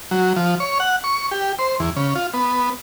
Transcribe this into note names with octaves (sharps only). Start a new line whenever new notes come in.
F#3
F3
C#5
F#5
C#6
G4
C5
E2
C#3
F4
B3